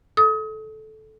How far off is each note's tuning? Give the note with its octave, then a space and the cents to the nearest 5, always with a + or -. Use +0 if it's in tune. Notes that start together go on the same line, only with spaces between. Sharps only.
A4 -15 D#6 +35